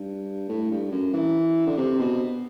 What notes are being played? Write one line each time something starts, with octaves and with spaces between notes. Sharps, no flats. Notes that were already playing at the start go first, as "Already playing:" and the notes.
Already playing: G2
A2
G2
F#2
E3
D3
C3
B2